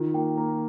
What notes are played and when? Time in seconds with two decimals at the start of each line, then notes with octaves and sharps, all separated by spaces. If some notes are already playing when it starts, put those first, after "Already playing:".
Already playing: D#3 F4
0.14 A#3 G5
0.37 A#3 A#5